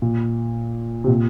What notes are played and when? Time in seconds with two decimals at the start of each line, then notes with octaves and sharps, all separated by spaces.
0.02 A#2
1.04 C3
1.08 A#2